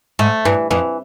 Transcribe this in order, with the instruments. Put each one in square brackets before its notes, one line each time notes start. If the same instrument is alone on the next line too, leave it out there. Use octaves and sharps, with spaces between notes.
[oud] G#2 [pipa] A3
[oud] G2 [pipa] E3
[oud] F2 [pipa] E3